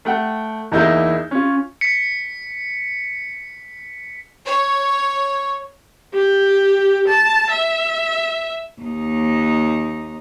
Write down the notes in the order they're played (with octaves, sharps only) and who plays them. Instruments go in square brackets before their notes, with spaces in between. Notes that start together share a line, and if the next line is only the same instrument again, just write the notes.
[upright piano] A3 F#5 G5
E2 A#3 D#4 E4 G#4 G6
C#4 F4
[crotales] B6 C#7
[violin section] C#5
[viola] G4
A5
E5
[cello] D#2 D#4